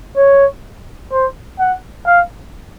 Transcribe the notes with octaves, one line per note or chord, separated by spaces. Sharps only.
C#5
C5
F#5
F5